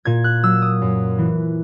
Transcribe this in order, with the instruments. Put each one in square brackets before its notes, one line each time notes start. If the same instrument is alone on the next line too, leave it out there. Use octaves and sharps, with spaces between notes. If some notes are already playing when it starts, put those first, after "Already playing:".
[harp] A#2 G#6
F#6
F#3 E6
D#6
F#2
E3